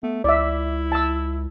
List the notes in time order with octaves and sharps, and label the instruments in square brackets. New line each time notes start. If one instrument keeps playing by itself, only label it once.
[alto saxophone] A3 [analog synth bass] B3
[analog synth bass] C#2 [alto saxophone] E4 [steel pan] D5 E5
[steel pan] A5 E6